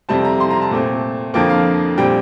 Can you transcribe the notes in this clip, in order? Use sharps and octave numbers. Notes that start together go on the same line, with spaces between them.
F2 C3 G3 C4 A5
A#5
C6
A#5
A5
A#2 A3 C4
F2 D3 F3 A#3 G5
F5
A#2 G3 C4 G5